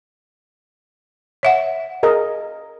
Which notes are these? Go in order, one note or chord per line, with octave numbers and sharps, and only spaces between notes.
C#5 E5 F#5
G#4 A#4 D#5